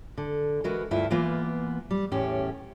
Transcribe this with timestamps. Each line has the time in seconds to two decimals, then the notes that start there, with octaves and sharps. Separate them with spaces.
0.17 D3
0.64 E3 G#3 F#4 A#4 B4
0.91 D2 G2 E4 F4 E5
1.11 E3 A#3 B3 F4
1.91 G3
2.11 E2 A2 C#4 G4